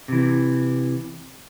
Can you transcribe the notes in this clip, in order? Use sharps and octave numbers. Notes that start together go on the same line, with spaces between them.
C3 E3